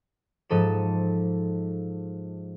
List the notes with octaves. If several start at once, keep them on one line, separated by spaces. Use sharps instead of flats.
G#2 F3 A4 D#7 E7